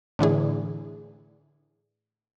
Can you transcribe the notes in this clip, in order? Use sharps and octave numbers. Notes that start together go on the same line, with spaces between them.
A2 D3 E3 G#4